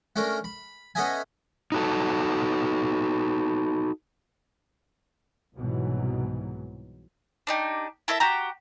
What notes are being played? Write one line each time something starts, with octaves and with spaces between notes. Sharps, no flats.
A3 C#4 D4 A#4
B5
B3 C#4 A4 D#5 E5 G#5
D#4 F#4 A4
C2 G#2 B2 E3 F#3
D4 D#4 G4
E4 A4 A#4 E5
F#4 G4 G5 A#5